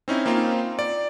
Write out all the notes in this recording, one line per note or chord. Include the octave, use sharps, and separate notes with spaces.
C4 C#4 D#4 E4
A#3 C4 D#4 F4
D5